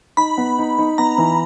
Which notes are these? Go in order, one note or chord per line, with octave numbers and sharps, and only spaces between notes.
D#4 B5
B3
D#4
D#4
B3 A#5
E3